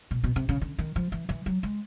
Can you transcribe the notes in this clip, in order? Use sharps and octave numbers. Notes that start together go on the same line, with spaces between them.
B2
B2
C3
C#3
D3
D#3
F3
E3
E3
F#3
G#3